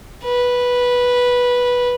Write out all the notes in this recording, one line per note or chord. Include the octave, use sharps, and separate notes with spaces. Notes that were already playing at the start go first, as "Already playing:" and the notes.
B4